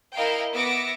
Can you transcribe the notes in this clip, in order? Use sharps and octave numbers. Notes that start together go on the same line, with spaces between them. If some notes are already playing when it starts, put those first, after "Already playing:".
E4 A#4 D#5 F5 G5
B3 E5 D6 A#6 C#7 D7